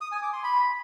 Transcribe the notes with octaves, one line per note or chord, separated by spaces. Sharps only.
D#6
G#5
D6
C6
B5